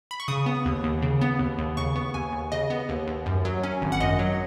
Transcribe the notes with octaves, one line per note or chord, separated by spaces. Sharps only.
B5
C#6
C#3 D#6
B3
D#2
D#2
C#3
B3
D#2
D#2
C#3 C#6
B3
D#2 G#5
D#2
C#3 D#5
B3
D#2
D#2
F#2
F#3
C#4
G#1
F#5
F#2 D#5
F#3